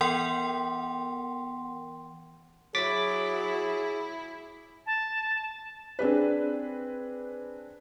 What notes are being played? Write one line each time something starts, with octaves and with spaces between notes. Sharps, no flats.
E3 B3 A#4 F#5 G5 C6
F#3 E4 G#4 D6 A6 B6
A5
C4 D4 G#4 B4